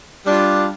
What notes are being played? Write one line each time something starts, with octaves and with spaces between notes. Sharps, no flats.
G3 D4 F4